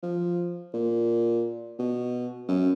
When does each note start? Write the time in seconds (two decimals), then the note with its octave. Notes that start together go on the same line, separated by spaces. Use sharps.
0.03 F3
0.73 A#2
1.79 B2
2.48 F#2